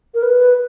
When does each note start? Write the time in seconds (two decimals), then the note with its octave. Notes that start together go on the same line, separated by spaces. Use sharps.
0.14 A#4
0.23 B4